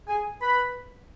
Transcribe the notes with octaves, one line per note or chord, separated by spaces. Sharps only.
G#4 G#5
B4 B5